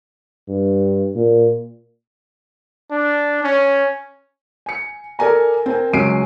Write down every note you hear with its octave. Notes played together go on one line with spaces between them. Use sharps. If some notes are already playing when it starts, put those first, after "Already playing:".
G2
A#2
D4
C#4
G#5 C#7
A4 A#4 D5 G#5 A#5
C4 A#4 G#5
C#2 F#3 G#5 C7 D7 D#7